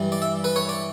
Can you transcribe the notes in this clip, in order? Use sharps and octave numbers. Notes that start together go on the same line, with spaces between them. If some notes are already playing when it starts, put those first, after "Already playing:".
Already playing: G2 E3 G3
D5
E5
B4
C#5
D5